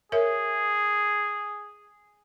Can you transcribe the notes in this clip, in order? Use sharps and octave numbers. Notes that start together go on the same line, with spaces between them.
G#4 A#4 C#5 E5